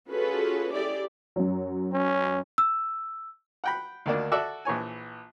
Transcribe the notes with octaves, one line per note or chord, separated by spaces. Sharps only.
C#4 F4 F#4 G#4 A4 B4
E4 G4 G#4 D5
F#2 F#3
C#4
E6
F#5 G5 B5
D2 D#3 A#3 D4
F#4 A4 D5 E5
A#1 E3 C#5 G#5